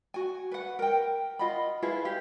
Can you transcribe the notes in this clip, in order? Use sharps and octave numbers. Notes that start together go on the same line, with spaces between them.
F#4 G#5
B4 F#5
A#4 G5
F4 D#5 F#5 B5
E4 F4 G#4 B4
G4 F5